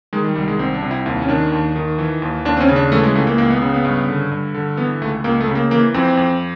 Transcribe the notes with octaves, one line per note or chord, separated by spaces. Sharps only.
D#3 G#3
G3
C2 G3
G#3
C2 C4
D4
C3
E4
D#2 E4
C#4
D#3 D4
D#2
D#3
E3
D#2
D#2 D4
C4
C#4
C#3
D4
E3 A3
G#3
C#2 A3
A#3
C#2 A#3
B3
C#3 B3
B3
G2
D3
G2
D3
E3 B3
C#2 A3
C#2 A#3
A3
C#3
A#3
E3 A#3
F2 C4
F2